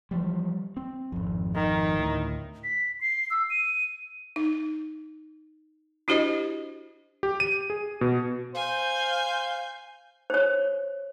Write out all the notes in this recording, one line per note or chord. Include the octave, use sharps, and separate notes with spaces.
E3 F3 G3
C4
G#1 F2
D#3
D2 A2
B6
C7
E6
D#7
D#4
D4 E4 F#4 G4 C5 D#5
G4
D#7
G#4
B2
C5 F5 G#5 G6
C5 C#5